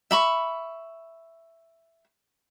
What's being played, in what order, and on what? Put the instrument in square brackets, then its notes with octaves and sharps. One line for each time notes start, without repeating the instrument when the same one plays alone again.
[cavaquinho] E5 B5 C#6